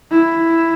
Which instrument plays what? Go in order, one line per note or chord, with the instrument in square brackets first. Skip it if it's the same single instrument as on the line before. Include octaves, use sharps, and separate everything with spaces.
[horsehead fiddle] E4